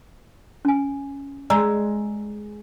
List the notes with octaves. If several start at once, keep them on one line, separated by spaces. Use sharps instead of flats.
C#4 G#5
G#3 D5 A#5 E6